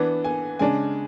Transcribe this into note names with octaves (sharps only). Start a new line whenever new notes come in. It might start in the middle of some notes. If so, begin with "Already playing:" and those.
Already playing: E3 B3 D4
G#5
C#3 G#3 D4 G#5